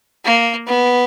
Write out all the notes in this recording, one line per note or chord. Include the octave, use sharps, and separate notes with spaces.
A#3
B3